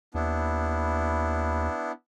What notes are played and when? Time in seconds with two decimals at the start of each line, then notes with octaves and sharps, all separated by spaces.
0.14 D#2 B3 D4 E4